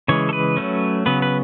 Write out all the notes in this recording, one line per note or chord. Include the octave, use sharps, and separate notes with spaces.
C#3 E3 G#3 C#5
A4
B4
F#3 A3 C#4
C#3 F#3 B3 B4
B4